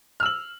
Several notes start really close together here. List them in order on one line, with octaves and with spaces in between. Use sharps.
F6 E6 F#7